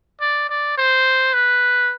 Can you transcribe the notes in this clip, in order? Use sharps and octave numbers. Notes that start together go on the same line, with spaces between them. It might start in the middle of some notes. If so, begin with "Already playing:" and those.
D5
D5
C5
B4